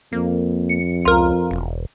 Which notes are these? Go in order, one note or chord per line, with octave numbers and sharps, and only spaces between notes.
F2 A#3
C#7
C#2 F4 A#4
E1